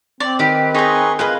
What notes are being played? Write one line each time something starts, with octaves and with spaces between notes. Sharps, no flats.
C4 D5
D#3 G4 B4
D#4 G#4 B4 C6 C#6
F4 G#4 B4 D#5